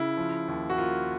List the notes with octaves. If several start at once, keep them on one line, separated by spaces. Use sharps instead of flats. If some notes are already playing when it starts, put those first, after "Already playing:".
Already playing: C#3 E4
F3
D#2
F#4
A#3 F4